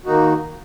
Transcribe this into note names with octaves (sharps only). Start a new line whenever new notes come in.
D#3 A#3 D#4 F#4